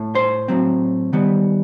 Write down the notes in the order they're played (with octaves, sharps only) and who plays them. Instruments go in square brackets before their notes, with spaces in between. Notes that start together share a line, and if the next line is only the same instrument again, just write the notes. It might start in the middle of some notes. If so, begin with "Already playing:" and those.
Already playing: [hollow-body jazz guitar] A2 A3
C5 C6
A2 F#3 C4
D#3 G3 B3